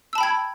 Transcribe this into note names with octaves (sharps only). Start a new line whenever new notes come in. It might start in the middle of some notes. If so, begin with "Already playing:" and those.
G5 A5 B5 E6 G#6